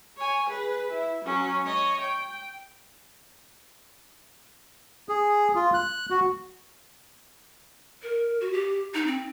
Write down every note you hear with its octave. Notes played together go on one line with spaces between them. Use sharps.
C#5 G#5
G#4 B4
E4
F#3 C#4
C#5 D#5
G5
G#4
F4
F#6
F#4
A#4
F#4
G4
D#4
C4